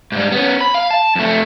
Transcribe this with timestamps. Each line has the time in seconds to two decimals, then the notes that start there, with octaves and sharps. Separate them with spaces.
0.12 G#2 G3
0.32 B3 C#4
0.61 B5
0.74 F5
0.90 A5
1.16 F2 A3